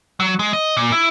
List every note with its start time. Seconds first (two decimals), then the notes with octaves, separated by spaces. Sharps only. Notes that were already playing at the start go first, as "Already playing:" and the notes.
0.20 F#3
0.39 G#3
0.53 D#5
0.77 A#2
0.92 E4